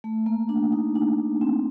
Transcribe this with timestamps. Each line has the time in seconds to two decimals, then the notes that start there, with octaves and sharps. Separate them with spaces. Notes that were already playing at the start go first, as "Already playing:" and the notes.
0.04 A3
0.26 A#3
0.49 D4
0.72 D#4
0.95 D4
1.41 C4